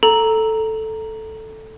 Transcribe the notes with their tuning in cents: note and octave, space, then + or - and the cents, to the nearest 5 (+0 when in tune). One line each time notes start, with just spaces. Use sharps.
A4 +0 A#5 +0